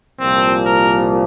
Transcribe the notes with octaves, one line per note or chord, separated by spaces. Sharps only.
C2 A#2 F3 C4
A#4